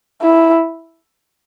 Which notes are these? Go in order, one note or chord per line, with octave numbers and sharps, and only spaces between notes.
E4